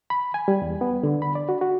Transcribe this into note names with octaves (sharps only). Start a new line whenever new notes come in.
B5
G#5
G3
E2
B3
D3
B5
D5
F#4
F#4